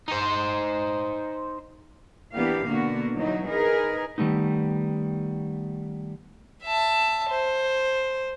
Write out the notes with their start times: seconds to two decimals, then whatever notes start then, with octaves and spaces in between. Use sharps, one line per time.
0.08 D#4 C5
2.33 E3 A#3 B3 D4 G4 F5
2.65 B2 D3 A#3 B3 F#4
3.15 E3 F#3 D#4
3.47 D#4 G#4 A#4 B4
4.18 D#3 G3 A3 B3 D#4
6.64 E5 A5
7.29 C5